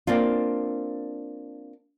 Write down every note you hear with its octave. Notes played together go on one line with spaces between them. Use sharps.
A#3 C4 D4 F4